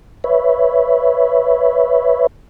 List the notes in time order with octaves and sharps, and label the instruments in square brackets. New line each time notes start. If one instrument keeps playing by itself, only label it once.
[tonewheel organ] B4 C#5 E5